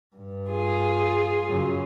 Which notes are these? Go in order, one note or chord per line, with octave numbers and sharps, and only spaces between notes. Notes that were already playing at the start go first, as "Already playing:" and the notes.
G2
F4 G#4
F#2 C#3